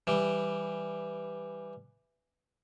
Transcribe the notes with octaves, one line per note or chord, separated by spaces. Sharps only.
E3 G3